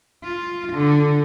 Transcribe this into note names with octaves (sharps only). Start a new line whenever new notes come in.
F4
D3